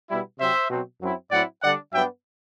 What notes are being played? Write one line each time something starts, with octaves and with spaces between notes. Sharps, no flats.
B2 G3 B3 E4
C3 F#3 C4 C5 E5
B2 F#3 C4
F#2 F#3 C4 E4
A2 F#3 C4 E4 D5 F#5
D3 G3 D4 D5 F#5
G2 F#3 B3 D4 E5 G5